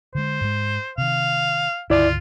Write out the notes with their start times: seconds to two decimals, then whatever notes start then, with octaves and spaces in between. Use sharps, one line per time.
0.15 D3 G#3 C5
0.41 G#2 G#3
0.98 C3 D#3 F5
1.90 C#2 G2 D3 E4 F4 D5